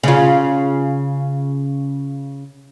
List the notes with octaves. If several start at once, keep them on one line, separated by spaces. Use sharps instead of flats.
C#3 F4